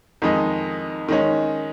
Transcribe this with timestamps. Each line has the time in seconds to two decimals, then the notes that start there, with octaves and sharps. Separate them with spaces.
0.22 F2 D#3 G#3 D#4
1.09 D#3 G#3 C#4